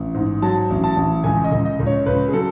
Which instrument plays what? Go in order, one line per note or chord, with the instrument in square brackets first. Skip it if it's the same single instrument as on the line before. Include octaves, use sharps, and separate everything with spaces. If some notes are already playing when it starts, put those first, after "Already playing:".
Already playing: [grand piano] A1
G#2
F#3 A5
A1
A5
A1
C#2 G#5
D#5
C#2
D#5
C#2
C#5
C#2 B4
G#4
F#3 A4